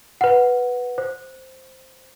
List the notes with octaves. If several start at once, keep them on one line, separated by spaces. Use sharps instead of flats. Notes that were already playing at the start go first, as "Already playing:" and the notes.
B4 F#5
C5